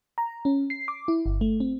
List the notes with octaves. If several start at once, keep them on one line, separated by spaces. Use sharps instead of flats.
A#5
C#4
C7
D6
E4
G1
A3
C4